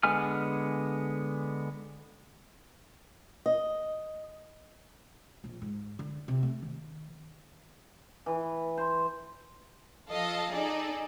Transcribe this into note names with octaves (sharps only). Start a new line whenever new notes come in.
D3 G#3 B3 G#5 F6
D#5
A#1
G#2
D3
C3
A3
D#3
E3
C5
F3 A4 D#5 F5
D#4 G#4 A4 D5